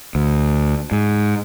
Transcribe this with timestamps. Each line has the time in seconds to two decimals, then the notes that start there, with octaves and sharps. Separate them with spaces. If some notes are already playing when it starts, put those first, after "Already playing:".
0.15 D2
0.92 G#2